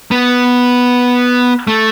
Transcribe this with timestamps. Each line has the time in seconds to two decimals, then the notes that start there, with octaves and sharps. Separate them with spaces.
0.11 B3
1.67 A3